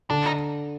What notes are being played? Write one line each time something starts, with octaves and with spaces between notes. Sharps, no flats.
D3 D4
D#4